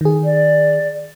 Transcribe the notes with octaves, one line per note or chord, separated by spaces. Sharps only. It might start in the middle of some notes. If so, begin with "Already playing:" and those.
D#3 G#4
D5